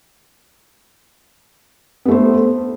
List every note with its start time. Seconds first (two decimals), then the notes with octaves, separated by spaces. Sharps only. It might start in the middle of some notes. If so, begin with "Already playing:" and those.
2.05 B3
2.08 A3
2.11 C5